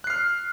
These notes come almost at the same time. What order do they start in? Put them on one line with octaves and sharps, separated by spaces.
F#6 C7 F6